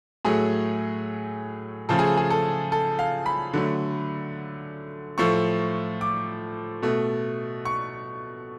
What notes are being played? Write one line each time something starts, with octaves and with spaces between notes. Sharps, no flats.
A2 F#3 A3 G#4
C#3 F3 A3 A4
G#4
G#4
A4
A4
F5
B5
D3 F#3 A3
A2 F3 A3 C#6
D6
B2 A3
C#6